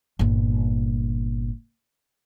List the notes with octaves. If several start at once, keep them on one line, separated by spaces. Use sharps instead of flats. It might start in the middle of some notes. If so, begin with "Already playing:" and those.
G1 A#2